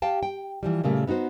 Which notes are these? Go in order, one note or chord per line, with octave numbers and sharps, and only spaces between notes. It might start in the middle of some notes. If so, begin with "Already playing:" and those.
G4 F5 G5 A5
G5
E3 F3 G3
A#2 C#3 G3 A3 A#3
B3 D#4 F4 F#4 C5